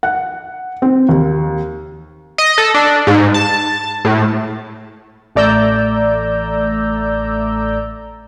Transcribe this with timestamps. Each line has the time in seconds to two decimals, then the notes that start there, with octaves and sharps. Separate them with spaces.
0.03 F#5
0.82 C4
1.09 D#2
2.38 D#5
2.58 A4
2.74 D4
3.07 G#2
3.34 A5
4.05 A2
5.35 A1 A3 D5 A#5 E6 G6